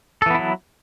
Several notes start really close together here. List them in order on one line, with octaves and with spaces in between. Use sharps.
A4 E3 B3 E4 F#3